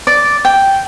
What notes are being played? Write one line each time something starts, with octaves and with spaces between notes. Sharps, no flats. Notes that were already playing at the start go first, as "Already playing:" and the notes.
D5
G5